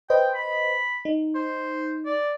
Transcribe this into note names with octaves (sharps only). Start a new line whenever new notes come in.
B4 C5 D#5 G5
B5
D#4
C5
D5